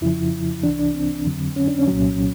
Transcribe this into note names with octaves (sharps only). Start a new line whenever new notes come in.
F2 C#3 F3 E4
C2 C3 E3 D4
D4
C4
F2 D3 F#3
C#4
D4
C#4
C2 A#2 F#3